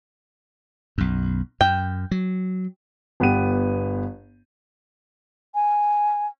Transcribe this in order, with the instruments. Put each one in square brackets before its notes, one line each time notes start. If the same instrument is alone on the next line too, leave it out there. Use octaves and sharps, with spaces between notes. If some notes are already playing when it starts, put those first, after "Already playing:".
[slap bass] B1 F#2
[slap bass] F#2 [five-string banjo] G5
[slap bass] F#3
[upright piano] G1 B3 G4 D#7
[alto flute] G#5